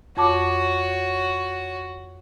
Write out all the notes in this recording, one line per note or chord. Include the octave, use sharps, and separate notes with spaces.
F2 F#4 C#5 A5 D6